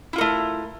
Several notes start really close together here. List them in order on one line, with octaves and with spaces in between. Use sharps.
E4 F4 A#4 A3